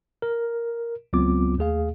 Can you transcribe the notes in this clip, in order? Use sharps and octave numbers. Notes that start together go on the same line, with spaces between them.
A#4
C#2 F#3 B3 C4 F4 D6
D#2 A3 G#4 F5